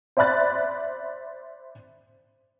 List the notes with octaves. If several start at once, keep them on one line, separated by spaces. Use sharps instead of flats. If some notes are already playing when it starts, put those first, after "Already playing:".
C5 D5 E5 B5 F#6 A6